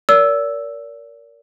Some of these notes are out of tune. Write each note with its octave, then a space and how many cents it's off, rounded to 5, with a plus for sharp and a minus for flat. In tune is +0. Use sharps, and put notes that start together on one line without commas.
A#4 +0 D5 -35 E6 +0